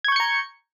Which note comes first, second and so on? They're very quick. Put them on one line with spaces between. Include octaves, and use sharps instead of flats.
G#6 C#6 G6 C#7 A#5